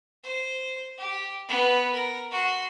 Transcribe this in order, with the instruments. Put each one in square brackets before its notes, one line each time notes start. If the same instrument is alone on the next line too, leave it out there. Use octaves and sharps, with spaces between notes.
[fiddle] C5
G4
B3 B4
A#4
F#4 C6